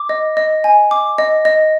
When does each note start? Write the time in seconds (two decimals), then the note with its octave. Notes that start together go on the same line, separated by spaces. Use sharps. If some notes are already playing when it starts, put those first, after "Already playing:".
Already playing: D6
0.09 D#5
0.37 D#5
0.64 G#5
0.91 D6
1.18 D#5
1.45 D#5